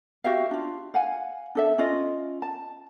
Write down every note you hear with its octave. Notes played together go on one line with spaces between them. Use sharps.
F#4 G4 E5 F5
D4 F4
F5 F#5 G#5
D4 A4 E5
C#4 F4 D#5
A5